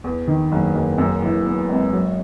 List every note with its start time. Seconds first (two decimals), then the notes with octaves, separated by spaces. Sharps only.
0.04 E2
0.27 D#3
0.52 F#1
0.75 F#1
0.98 F#2
1.22 E3
1.46 B3
1.69 G#1
1.93 F#3